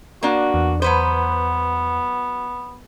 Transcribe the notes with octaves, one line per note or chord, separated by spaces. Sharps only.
A#3 D4 F#4
E2
F#3 B3 B4 C5